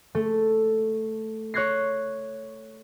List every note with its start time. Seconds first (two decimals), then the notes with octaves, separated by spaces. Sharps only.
0.15 A3
1.54 C#5 C#6 F#6 G#6 A#6 C7